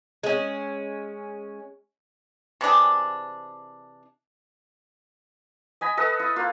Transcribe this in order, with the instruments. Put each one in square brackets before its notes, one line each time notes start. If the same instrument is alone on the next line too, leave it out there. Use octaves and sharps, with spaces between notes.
[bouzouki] G#3 C#4
[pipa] C3 E3 D4 G#4
[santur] D#5 G#5 B5
A4 B4 D#5
E4
A#3 F4